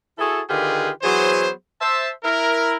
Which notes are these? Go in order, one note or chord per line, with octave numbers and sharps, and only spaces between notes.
E4 F#4 G#4 A4
D3 D#3 F4 G4 G#4 B4
E3 F#3 B3 G#4 C5
C5 E5 A5
E4 A#4